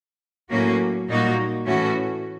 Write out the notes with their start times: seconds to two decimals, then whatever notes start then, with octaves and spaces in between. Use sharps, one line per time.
0.50 A2 F#3 A#3 C#4 F#4
1.08 A#2 G3 A#3 D#4 F#4
1.66 A2 E3 A3 C#4 F#4